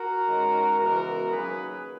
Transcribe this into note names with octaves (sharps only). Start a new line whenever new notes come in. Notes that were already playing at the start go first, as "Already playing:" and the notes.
Already playing: F#4 A#4
D#3 G#3 C#4
C#3 E3 G#3 B3 F#4 A#4
D#3 F#3 A#3 C#4 G#4 B4